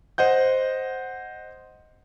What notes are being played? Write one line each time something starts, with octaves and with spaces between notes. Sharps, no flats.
C5 D#5 F#5 G6